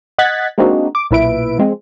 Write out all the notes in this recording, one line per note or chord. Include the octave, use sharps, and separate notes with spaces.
D#5 F#5 F#6 G#6 A6 B6
G#3 A#3 C4 D4 D#4 F#4
D6
B1 A#2 E4 B4 E5 D7
F3 G#3 C4